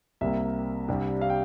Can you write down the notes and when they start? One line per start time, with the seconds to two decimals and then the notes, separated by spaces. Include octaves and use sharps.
0.21 C2 C3 G3 A#3 E5
0.88 C2 C3 G3 D4
1.21 F5
1.30 G5